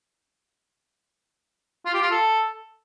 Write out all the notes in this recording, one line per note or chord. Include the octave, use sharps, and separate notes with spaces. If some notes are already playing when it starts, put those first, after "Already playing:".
F4
G4
F4
A4